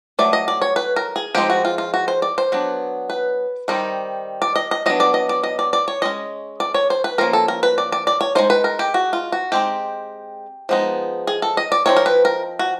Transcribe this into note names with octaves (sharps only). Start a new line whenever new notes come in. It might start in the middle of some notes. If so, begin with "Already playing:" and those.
F#3 A3 D5
D#5
D5
C#5
B4
A#4
G#4
F3 G#3 C4 D#4 G4
F#4
F4
F4
F#4
C5
D5
C5
F#3 B3 D4
B4
D#3 G3 C4 D#4
D5
D#5
D#5
F#3 B3 D4 D#5
D5
D#5
D5
D#5
D5
D5
C#5
G#3 C#4 D#5
D5
C#5
C5
B4
F3 A#3 C#4 A#4
A4
A#4
B4
D5
D5
D5
C#5
G#3 C4 D#4 C5
B4
A#4
G4
F#4
F4
F#4
G#3 C4 D#4 G4
F3 G#3 B3 D#4
G#4
A4
D#5
D5
F3 A3 C4 D#4 C#5
A#4
B4
A#4
F#4